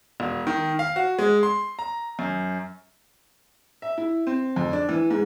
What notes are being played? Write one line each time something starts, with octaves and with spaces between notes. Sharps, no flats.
E1
D#3
F5
F#4
G#3
C6
A#5
F#2
E5
E4
C4
F2
D4
E3
G#2